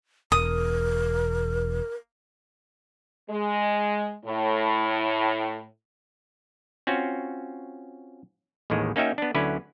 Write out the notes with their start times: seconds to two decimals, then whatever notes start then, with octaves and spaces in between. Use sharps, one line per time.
0.32 E1 A#4 D#6
3.30 G#3
4.26 A2
6.87 C4 C#4 F4 F#4
8.70 A1 D#2 A2 D#3 G#3
8.96 A#3 C#4 D#4 F#4 E5 G5
9.18 B3 D4
9.34 D2 D3 F#3 C#4 E4 B4